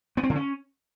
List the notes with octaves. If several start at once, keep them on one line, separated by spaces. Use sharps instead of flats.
B3
C4
D3
C#4